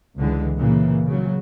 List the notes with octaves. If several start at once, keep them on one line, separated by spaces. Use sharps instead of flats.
C#2 D3 E3 G#3
A#2 C#3 E3 A#3
C#3 F#3